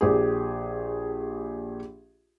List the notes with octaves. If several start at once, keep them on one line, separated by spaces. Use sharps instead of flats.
A#1 G4 G#4